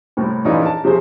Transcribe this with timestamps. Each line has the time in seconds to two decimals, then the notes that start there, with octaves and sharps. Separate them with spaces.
0.17 C2 A2 A#4
0.45 A#1 E3 C#4 D#4 F4 D5
0.62 A#4 A5
0.84 C3 F3 C#4 G#4 C5